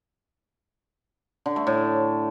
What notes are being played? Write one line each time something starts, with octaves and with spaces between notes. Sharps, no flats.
D3
A3
A2